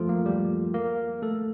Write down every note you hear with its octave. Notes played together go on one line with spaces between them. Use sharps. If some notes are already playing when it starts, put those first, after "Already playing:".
Already playing: F3 A3 F4 A4
A#3
G3 G4
A#3 A#4
A3 A4